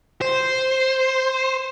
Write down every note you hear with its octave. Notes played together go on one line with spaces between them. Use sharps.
C5